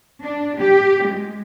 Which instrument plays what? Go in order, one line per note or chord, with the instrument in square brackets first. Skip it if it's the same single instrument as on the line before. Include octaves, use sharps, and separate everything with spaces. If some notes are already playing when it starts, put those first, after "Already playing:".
[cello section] D4
G4
G#3